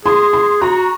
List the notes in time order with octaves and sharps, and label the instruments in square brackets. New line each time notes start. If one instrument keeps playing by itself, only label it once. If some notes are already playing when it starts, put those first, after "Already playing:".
[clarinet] G#4 [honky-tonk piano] C6
[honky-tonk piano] C6
[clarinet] F#4 [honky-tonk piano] A#5